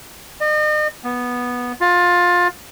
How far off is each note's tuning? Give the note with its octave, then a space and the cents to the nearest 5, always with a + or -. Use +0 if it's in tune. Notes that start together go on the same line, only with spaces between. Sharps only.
D#5 -40
B3 -10
F4 +20